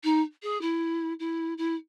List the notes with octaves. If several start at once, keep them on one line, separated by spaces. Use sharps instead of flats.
D#4
G#4
E4
E4
E4